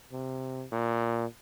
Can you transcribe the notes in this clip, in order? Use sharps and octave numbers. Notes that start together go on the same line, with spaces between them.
C3
A#2